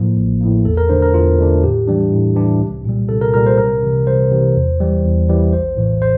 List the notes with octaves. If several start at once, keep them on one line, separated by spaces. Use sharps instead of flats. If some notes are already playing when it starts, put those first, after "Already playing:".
Already playing: A2 F3 A#3
A1
A2 F3 A#3
E2 A4
A#4
D3 A3 D4 C5
A#4
E2 F4
D3 A3 D4
A2 G4
E3 G3 D4
A2
E3 G3 D4
C2
A#2 G3
C2 A4
A#4
A#2 G3 A#4
C5
C2 A#4
C3 E3
C2 C5
C3 E3
E2
E3 G3
E2
E3 G3
A#1 C5
A2 E3
C5